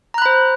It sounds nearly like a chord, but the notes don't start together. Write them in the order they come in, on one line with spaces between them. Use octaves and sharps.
A#5 F#6 B5 C5